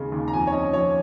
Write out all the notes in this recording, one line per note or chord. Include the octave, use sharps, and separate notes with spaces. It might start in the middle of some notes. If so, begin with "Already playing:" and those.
Already playing: D#2 C#3 G#3
D#2
A#5
F2 G#5
C#5
C#4 D#5
F3 C#5